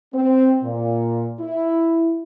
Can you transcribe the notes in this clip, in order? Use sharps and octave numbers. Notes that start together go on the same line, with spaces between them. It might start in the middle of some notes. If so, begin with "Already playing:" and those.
C4
A#2
E4